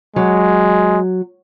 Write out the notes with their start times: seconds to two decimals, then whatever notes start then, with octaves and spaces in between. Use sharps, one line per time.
0.16 F#3 G#3